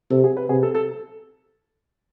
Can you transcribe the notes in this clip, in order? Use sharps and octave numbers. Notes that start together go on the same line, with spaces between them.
C3 A4
G#4
B4
C3 G#4
A4
A4